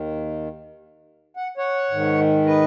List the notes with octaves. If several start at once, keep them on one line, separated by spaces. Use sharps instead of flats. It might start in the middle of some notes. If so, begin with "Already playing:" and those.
Already playing: D#2 D#3
F#5
C#5 F#5
G#2 D#3
B4 D#5